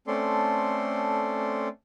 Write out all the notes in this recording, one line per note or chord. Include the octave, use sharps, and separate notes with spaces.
A3 C4 C#4 A4 D5 C6